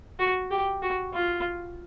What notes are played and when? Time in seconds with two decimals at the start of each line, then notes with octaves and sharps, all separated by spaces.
0.19 F#4
0.51 G4
0.82 F#4
1.14 F4